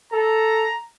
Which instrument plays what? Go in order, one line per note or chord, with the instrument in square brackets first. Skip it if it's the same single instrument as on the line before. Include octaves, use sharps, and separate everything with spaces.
[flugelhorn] A4 [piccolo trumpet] A#5